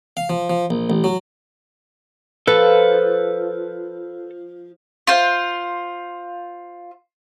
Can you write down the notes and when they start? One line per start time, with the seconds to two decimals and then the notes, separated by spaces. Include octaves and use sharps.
0.17 F5
0.29 F3
0.50 F3
0.70 A#1
0.90 A1
1.04 F#3
2.47 F3 A4 B4
5.07 F4 C5